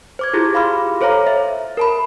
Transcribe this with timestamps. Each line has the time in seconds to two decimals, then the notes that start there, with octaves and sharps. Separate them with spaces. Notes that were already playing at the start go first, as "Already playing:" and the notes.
0.19 C5 D6 G#6
0.33 E4 F4 G4 G#4
0.55 F5 B5 C6 D6 F6
1.01 A4 C5 C#5 F5 A#5
1.27 E5
1.77 A#4 A5 B5